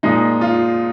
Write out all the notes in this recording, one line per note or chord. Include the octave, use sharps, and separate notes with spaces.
A#2 F3 G#3 D#4
F4